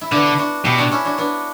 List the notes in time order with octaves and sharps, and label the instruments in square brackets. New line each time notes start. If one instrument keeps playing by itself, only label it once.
[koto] E4
[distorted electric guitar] D3 [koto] B3 D4
[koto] D4 F#4
[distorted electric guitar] B2 [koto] E4 G4
[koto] D4 F#4
C#4 E4
D4 F#4
B3 D4